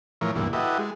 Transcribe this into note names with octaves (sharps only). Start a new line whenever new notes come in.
A2 E3 F3 A#4 C#5
D2 G2 A#2 E3
E4 F#4 G4 A4 B4 D#5
G#3